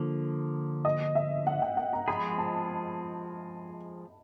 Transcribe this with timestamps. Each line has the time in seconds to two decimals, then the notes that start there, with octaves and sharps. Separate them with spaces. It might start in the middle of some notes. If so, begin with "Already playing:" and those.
Already playing: D3 F3 A#3
0.85 D#5
1.15 E5
1.47 F#5
1.62 G5
1.77 F#5
1.93 A#5
2.08 F3 G#3 C4 F4 G#4 B5
2.38 A5